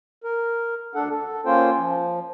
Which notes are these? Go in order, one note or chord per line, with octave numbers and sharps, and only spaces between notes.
A#4
D2 D4 A4 F#5
A4
A#3 C#4 F4 C5 G5
F3